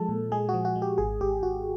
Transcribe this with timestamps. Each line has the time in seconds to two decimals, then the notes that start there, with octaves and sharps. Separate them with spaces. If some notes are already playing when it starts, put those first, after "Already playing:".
Already playing: F3 G#3 A4
0.09 A#2
0.32 G#3 G#4
0.49 F#4
0.54 F3
0.65 F#4
0.75 G#3
0.82 G4
0.98 G#1 G#4
1.21 G#1 G4
1.43 G#1 F#4